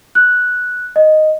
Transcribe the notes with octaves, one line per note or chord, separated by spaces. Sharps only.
F#6
D#5